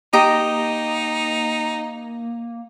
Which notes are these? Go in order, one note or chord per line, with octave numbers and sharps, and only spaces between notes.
A#3 D#4 G4 D#5 A#5